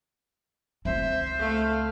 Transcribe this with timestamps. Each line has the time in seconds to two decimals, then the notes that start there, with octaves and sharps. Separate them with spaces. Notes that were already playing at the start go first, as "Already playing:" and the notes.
0.85 C#2 C4 C5 E5
1.39 A3 F5